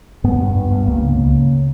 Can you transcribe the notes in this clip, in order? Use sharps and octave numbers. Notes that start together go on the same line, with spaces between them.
G2 B3
G2
G2
G2
C#2 A#3
C#3
C#3